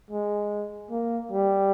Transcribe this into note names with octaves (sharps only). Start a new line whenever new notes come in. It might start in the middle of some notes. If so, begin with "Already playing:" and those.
G#3
A#3
G3